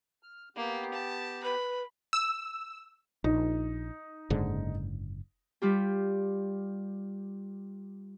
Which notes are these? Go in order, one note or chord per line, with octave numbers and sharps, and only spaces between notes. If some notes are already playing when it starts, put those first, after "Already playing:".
F6
A#3 B3 G4
A5
B4 B5
E6
A#1 D#4
F#1 G#2 D3
G3 F4 G4